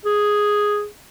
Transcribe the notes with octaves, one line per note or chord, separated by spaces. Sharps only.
G#4